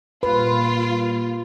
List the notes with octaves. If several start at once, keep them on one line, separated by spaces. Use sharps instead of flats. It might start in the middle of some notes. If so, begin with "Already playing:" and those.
A#2 G3 A#3 F4 B4